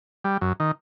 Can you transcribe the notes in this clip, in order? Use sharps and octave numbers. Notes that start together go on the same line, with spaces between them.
G3
F#2
D#3